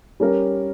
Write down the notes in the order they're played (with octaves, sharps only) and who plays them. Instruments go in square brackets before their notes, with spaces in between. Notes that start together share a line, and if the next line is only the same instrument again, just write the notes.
[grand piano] G3 C#4 G4 A#4